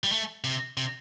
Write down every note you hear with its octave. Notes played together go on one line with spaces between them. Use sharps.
G3
A3
C3
C3